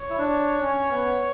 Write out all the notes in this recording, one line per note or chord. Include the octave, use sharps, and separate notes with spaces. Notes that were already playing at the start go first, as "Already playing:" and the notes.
Already playing: C#5
E4
D4
C#4
B3